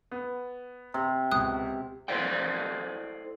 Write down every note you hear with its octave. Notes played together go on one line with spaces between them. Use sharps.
B3
C3 C6
C#2 B2 D#6 F#6
E4 A4 C5 D5 D#5 G5